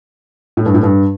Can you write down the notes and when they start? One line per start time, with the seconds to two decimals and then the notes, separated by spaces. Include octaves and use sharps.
0.57 A2
0.66 G2
0.74 A2
0.83 G2